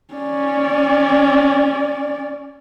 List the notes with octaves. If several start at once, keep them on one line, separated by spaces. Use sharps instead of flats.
C#4 D5